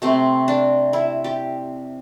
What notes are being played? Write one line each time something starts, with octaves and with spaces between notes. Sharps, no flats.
C3 A3 C4
D4
E4
G4